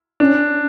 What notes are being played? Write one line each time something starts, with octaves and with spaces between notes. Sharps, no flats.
C#4 D4